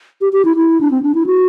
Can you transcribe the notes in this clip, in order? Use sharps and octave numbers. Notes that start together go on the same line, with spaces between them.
G4
G4
E4
E4
D4
C4
D4
E4
F#4